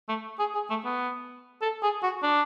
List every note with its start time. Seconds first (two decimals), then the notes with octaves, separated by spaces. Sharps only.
0.08 A3
0.39 G#4
0.55 G#4
0.70 A3
0.85 B3
1.62 A4
1.83 G#4
2.03 F#4
2.23 D4